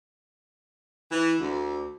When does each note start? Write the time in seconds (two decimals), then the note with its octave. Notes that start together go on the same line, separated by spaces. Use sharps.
1.11 E3
1.40 D2